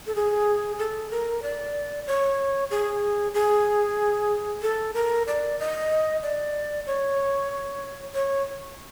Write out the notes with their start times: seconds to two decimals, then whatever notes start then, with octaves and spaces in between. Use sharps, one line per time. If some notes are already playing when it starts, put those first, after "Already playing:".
0.07 A4
0.15 G#4
0.79 A4
1.11 A#4
1.43 D5
2.07 C#5
2.71 G#4
3.34 G#4
4.62 A4
4.94 A#4
5.27 D5
5.59 D#5
6.23 D5
6.86 C#5
8.14 C#5